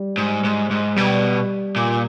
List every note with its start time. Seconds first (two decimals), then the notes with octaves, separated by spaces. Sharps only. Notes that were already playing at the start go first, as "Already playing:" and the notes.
Already playing: G3
0.18 G#2
0.44 G#2
0.71 G#2
0.97 B2 G3
1.76 A#2